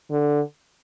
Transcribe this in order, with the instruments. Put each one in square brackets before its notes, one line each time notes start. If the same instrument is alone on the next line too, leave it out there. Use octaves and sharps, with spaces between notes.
[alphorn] D3